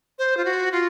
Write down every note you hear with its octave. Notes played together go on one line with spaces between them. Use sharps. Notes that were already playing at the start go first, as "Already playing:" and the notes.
C5
F4
F#4
F4